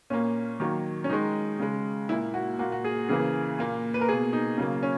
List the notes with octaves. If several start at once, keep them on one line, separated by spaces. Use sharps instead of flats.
A#2 A#3 C#4
D#3 F#3 A#3
C#4
D#3 G#3 D#4
C#3 G#3
A#2 A#3 E4
F#4
A#2 A#3 F#4
F#4
G#4
C#3 E3 A#3 G#4
A#2 A#3
B4
A#4
B2 A#3 G#4
D#4
C#3 F#3 A#3
C#4